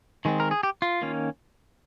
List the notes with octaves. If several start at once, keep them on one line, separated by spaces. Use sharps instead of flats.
D#3 G#3 C4
A#4
G#4
G4
F4
D#3 A#3 C#4